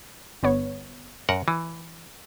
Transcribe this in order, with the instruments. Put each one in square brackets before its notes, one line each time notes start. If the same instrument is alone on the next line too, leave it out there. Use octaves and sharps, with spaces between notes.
[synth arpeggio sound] G1 B3 C#5
[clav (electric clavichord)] F#2 A#4 F#5
E3